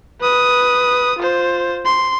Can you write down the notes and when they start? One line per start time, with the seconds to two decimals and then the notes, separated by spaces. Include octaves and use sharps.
0.21 B4 D#6
1.19 F4 C5
1.85 C6